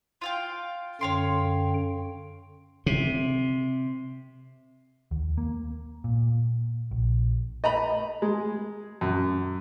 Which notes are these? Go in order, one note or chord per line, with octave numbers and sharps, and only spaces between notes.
F4 F5 G5
F#2 D3 C#5 F5 G5 C6
C3
D#2
A#3
A#2
A#1
D#5 A#5 B5
G#3
F#2